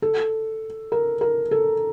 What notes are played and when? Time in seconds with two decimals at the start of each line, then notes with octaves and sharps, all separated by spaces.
0.02 A4
0.92 A#4
1.21 A#4
1.51 A4